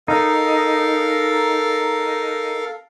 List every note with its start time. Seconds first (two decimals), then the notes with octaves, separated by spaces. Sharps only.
0.08 D#4 A4 A#4 F5